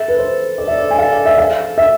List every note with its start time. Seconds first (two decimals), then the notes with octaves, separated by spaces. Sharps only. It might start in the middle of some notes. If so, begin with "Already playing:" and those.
Already playing: A4 E5
0.08 B4
0.19 C5
0.58 A4 D5
0.68 E5
0.78 D5
0.91 G#5
0.98 F5
1.13 D5
1.26 E5
1.38 A4 F5
1.78 E5